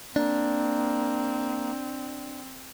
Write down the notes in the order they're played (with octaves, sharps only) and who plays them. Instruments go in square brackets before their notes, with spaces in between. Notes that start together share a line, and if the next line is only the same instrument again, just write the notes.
[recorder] A#3 [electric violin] C4 [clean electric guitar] D4